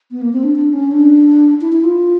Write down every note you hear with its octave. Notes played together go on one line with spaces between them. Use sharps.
B3
A#3
C4
D4
D4
C#4
D4
E4
E4
F4